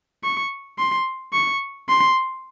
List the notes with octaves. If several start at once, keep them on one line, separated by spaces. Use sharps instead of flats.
C#6
C6
C#6
C6